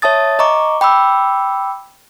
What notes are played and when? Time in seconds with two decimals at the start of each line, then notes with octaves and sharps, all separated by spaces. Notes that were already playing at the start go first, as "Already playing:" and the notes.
0.02 C#5 E5 A5 D#6 A6
0.39 D#5 A#5 C#6 D6
0.81 G5 B5 D6 E6